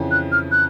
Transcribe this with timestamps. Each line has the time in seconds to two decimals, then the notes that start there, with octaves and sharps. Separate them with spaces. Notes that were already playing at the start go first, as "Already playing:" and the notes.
Already playing: F2 C#3 E3
0.11 F#6
0.32 F6
0.52 F#6